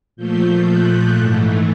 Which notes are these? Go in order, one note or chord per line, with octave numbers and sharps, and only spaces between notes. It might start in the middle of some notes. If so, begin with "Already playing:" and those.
A#2 F3 A3 G6
F#6
G#2 E3 A3